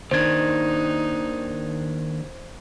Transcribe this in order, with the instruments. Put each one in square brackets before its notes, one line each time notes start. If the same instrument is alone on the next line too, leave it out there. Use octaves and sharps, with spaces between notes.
[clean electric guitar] D#2 D#3 D4 [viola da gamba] D#4 [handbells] C5 G#6